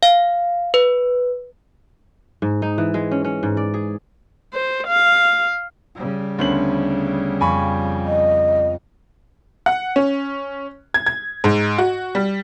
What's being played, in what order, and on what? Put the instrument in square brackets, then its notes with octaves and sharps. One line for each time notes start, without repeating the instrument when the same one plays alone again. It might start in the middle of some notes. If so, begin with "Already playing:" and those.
[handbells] F5
B4
[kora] G#2
D#4
E3
G#3
C#4
C#4
G#2
D5
G#4
[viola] C5
F5
[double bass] C#3 G3
[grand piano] D2 C#4 F#7 [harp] B3 C5
[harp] F2 [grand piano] G#5 B5 C#6
[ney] D#5
[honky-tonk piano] F#5
C#4
G#6
G#6
G#2
F#4
G3